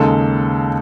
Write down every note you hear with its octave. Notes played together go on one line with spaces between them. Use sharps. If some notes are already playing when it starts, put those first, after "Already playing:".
Already playing: D#2 C#3 G#3 D#4 A4